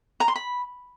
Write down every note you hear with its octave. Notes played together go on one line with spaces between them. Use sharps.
A#5
C6
B5